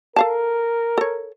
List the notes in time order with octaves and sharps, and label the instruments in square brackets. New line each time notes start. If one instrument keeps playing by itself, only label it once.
[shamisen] A4 F5 A5 [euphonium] A#4
[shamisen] A4 C#5